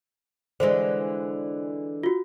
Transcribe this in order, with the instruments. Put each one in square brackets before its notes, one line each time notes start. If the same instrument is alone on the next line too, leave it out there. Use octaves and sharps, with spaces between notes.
[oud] D3 E3 G#3 [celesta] C5
[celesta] F4 F#4